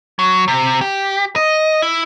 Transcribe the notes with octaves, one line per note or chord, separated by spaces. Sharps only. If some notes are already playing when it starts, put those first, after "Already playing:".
F#3
C3
G4
D#5
E4